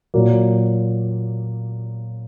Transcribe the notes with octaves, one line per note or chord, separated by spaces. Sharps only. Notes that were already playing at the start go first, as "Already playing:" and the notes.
A#2 F#3 A#3